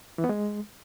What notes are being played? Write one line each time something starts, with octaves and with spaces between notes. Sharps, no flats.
E3
B3
G#3